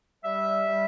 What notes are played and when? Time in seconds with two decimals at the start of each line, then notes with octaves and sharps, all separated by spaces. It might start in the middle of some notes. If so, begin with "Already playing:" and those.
0.24 G3 E5
0.68 G3